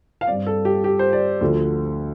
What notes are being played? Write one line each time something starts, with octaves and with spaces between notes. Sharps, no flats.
F5
G2 G3 C4 D5
A4
G4
G4
C5
D5
D2 D3 F3